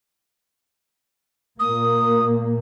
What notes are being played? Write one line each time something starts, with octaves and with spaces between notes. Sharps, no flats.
A#2 A#3 D#6